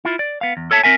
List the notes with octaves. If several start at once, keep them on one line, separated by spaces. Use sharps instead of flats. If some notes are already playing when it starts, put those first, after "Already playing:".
E4 F4
D5
B3 F5
E2
A4 C#5 E5 A5
C4 A#4 E5 G#5